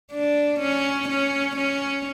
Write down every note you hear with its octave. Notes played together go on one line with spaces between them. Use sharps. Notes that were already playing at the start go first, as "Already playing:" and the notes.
D4
C#4
C#4
C#4